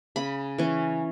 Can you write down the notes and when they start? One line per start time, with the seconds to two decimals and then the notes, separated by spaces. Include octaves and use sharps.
0.16 C#3 B5
0.58 E3 C#4